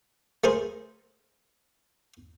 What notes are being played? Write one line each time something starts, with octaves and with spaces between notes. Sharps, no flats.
A3 G#4 A#4 C5